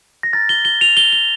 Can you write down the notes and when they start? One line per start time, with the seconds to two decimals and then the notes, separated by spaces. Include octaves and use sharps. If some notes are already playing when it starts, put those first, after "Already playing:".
0.23 A#6
0.33 A#5 F6 A6
0.49 G7
0.65 G7
0.81 F7
0.97 G7
1.13 G7